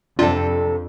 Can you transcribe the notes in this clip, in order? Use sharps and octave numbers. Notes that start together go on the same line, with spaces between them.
F2 C3 D4 F4 A4